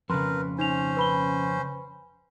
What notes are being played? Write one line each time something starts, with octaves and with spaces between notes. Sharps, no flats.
F2 C#3 A#4 B4 C6
C#4 D#4 C5 F7
B4 B5 G7